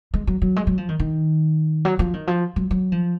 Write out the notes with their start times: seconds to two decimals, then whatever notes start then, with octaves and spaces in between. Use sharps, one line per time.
0.14 G#3
0.27 F#3
0.42 F#3
0.56 G#3
0.67 F#3
0.78 F3
0.89 D#3
1.00 D#3
1.85 F#3
1.99 F3
2.14 D#3
2.27 F3
2.56 F#3
2.71 F#3
2.92 F3